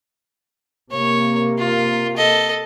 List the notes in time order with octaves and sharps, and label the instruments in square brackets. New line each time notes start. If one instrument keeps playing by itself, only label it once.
[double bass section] C3 A#3 [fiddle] C#5
[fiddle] F4
A4 D#5